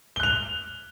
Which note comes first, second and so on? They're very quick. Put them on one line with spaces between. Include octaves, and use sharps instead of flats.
G7 F#6 F7